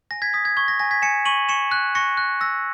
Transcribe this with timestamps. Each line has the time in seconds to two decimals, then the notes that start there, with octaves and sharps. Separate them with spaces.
0.11 G#5 A#6
0.22 G#6 B6
0.33 D#6 G#6 B6
0.45 G#6
0.57 C#6 G#6
0.68 A#6
0.79 G#5 A#6
0.91 G#6 B6
1.02 G#5 C#7 E7
1.25 C#6 D#7 F#7
1.49 C#6 C#7 E7
1.72 F#6
1.95 C#6 A#6 C#7
2.17 F#6
2.41 E6 A#6